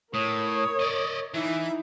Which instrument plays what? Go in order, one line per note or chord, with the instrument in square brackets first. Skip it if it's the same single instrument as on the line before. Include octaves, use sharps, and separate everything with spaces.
[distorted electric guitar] A2 [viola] A#4 C#5 [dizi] D#6
[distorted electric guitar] D5 D#5
[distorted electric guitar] E3 [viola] D#4 E4 [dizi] E5